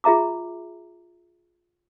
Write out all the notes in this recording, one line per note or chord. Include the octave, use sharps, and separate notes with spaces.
F4 G#4 E5 A#5 D6